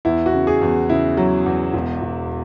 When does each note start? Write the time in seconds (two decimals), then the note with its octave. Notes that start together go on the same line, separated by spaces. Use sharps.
0.05 E2 E4
0.26 F#4
0.33 C#3
0.47 G#4
0.61 E2
0.89 C#3 E4
1.17 F#3
1.46 E2
1.73 E1
2.02 E1